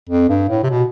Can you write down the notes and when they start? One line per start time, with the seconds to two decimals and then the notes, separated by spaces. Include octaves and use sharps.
0.09 F2
0.29 G2
0.49 A2
0.63 C3
0.70 B2